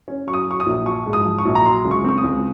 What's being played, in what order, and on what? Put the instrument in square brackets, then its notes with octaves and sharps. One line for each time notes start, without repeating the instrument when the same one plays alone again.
[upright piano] C#4
F#3 C#6
D#6
F#3 C#6
D#6
A#1
F3 C#6
G#2
D#6
F3
C#6
A#1
A#5
F#3 C6
C#2
C#6
C4 C#6
D#6
C#2